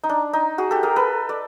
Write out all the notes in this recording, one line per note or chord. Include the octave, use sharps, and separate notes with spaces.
D#4
D4
D#4
F#4 G#4
G4 A4
G#4 A#4
A4 B4
D5